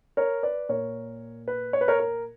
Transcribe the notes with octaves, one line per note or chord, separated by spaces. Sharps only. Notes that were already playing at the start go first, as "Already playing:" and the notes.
A#4 C#5
B4 D5
A#2 A#4 C#5
B4
C#5
B4
A#4 C#5
A#4